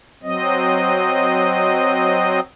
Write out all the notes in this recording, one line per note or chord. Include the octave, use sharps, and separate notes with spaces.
F#3 C4 D#5